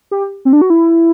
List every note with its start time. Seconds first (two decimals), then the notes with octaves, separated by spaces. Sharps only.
0.11 G4
0.45 C4
0.53 D4
0.61 F#4
0.70 E4